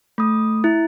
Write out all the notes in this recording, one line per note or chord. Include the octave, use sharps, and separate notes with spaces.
A3 D#6
E4